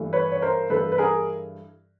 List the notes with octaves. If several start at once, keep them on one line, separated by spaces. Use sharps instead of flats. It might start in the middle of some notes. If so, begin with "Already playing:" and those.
Already playing: G2 E3 A3
B4 C#5
C#5
A#4 C5
G2 E3 A3 A4 B4
B4
G#4 A#4